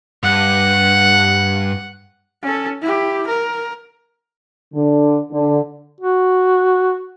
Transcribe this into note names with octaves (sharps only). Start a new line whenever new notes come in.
G2 F#5
C#4 A4
E4 G4
A#4
D3
D3
F#4